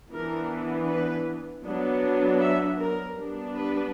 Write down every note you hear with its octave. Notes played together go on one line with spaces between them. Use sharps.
E3 B3 D4 A#4
B4
F#3 B3 D4
E5
A#4
G3 B3 D4
B4